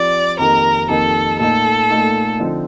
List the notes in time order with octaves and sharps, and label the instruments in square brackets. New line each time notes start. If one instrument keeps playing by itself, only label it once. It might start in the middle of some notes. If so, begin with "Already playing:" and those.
Already playing: [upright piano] F3 C4 G4 [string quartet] D5
[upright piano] F2 D#3 A#3 D#4 G4 [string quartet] A#4
[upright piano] F2 D#3 A#3 D#4 G4 [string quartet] A4
[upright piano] A#2 A3 D#4 [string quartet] A4
[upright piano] A#2 A3 D#4
D3 F3 C4 D#4